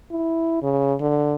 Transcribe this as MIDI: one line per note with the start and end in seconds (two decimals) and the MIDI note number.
0.11 0.62 64
0.62 0.94 49
1.00 1.35 50